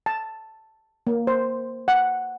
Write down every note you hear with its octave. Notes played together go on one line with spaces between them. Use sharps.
A5
A#3
C5
F#5